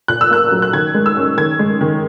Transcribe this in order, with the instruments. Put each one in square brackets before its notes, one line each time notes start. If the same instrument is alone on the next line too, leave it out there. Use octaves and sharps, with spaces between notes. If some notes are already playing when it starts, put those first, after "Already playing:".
[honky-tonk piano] A#2 F#6
E6
A#3 F#6
F#3
F#6
D#3 G#6
G#3
E6
C#4
D#3 G#6
G#3
D#3